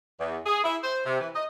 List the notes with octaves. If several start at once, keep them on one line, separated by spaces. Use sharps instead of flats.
E2
G#4
E4
C5
C3
E3
D#5